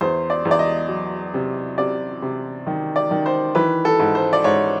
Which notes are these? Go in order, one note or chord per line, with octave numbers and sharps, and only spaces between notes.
E2 C5
D5
E2
D5
D#5
F#3
C3
C3 D5
C3
D#3
D5
D#3
C5
E3 B4
A4
G#2
C5
D5
G#2 C#5